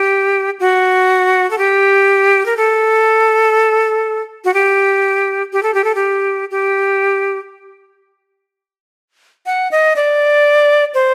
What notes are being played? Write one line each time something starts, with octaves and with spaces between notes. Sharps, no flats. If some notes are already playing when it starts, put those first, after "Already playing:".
Already playing: G4
F#4
A4
G4
A#4
A4
F#4
G4
G4
A4
G4
A4
G4
G4
F#5
D#5
D5
C5